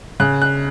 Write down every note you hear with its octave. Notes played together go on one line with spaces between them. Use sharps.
C#3 F#6
F#6